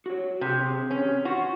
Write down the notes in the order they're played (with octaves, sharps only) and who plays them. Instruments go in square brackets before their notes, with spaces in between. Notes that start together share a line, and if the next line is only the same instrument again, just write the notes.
[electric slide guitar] F#4 C#5
[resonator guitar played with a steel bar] C3 [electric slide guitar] C4 G4 G#4
[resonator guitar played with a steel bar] C#4
[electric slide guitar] F4 [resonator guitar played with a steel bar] F#4